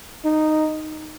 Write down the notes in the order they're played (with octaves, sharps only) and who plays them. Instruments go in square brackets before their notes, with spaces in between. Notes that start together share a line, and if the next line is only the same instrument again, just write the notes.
[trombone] D#4